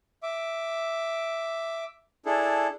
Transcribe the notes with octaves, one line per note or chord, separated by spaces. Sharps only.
E5 D6
D4 E4 G#4 A4